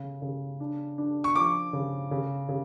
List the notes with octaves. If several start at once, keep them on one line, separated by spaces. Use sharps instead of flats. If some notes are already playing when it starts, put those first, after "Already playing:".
Already playing: C#3
C#3
D4
D4
C#6
F3 D6
C#3
C#3
C#3